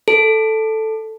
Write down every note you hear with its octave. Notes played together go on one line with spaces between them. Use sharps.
A4